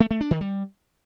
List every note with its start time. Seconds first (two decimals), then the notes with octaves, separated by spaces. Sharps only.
0.01 A3
0.11 A3
0.21 D4
0.31 D#3
0.41 G3